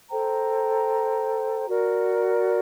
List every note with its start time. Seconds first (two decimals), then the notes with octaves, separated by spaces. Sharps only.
0.10 A4 C5 G5 A#5
1.68 F#4 A#4 D5